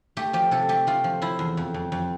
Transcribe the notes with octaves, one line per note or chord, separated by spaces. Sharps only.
A3 G4
F3 G4
C3 A4
A3 G4
A3 F4
F3
F3 E4
E2
F2
F2
F2